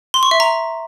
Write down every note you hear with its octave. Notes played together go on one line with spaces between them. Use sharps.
C6
C#6
E5
A#5